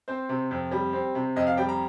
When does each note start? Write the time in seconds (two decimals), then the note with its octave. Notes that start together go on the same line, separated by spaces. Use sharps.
0.08 C4 C5
0.29 C3
0.51 F2
0.72 G3
0.93 C4
1.15 C3
1.36 F2 D#5
1.47 F5
1.57 G3 G5
1.69 A#5